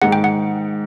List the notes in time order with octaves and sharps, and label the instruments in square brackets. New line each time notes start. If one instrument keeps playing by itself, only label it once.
[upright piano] G#2 D#3 G#3 [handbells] F#5
[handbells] G5
F#5